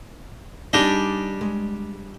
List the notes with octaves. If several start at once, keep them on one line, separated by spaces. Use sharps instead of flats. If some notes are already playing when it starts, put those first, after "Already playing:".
G3 D4 D#4 G#4 D#5
G#3